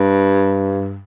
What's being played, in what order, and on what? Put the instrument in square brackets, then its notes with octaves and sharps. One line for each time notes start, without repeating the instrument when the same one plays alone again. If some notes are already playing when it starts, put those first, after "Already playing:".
Already playing: [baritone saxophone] G2